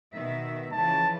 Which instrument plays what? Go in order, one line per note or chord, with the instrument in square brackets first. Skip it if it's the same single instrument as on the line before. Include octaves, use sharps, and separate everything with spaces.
[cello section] B2 D#3 E5
[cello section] C#3 E3 F3 [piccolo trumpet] A5